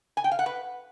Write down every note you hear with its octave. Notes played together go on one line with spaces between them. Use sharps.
G#5
G5
F5
F#5
B4